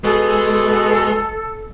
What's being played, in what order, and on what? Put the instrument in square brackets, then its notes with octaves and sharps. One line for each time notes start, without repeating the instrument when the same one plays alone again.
[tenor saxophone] B2 [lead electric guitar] G#3 [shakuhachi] A4